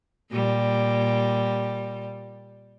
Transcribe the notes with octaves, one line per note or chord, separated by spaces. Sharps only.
A#2 G3